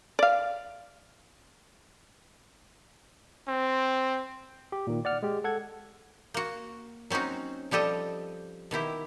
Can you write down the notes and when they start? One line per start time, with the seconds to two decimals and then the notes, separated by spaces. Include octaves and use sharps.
0.19 D5 F5
3.47 C4
4.72 G4
4.87 A#2 D#3
5.05 D5 F#5 F6
5.23 G#3 G4
5.44 A4 F#5 G#6
6.34 A#3 F#4
7.10 F#3 C4 C#4 D#4 F#4
7.71 F3 G3 G4 A4 D#5
8.71 B2 D#3 E4 G4